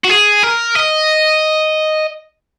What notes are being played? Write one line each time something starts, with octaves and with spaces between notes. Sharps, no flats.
F#4
G#4
A#4
D#5